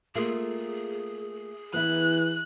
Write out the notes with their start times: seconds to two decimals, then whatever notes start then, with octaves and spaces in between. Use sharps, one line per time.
0.15 A3 A#3 F4 G#4
1.74 E3 B3 E4 F#6